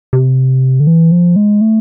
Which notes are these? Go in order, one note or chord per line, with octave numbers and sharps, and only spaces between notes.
C3
D3
E3
F3
G#3
A3